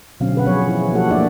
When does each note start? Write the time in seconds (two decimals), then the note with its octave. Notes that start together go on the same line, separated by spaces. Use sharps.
0.20 B2 D3 F#3 C4 C#4 F5
0.35 G#4 B4 F#5
0.46 F3 F#3 B3 G#4 C#5
0.67 E3 E4 G#4
0.92 F3 A#3 F#4 G4 A4 F#5
1.10 A3 A#3 D4 C#5 D5 E5